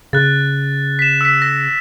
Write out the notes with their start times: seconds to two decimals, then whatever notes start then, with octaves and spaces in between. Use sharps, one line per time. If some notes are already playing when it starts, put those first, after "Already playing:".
0.13 C#3 F#6 A6
0.99 B6 E7
1.21 E6 B6
1.42 A#6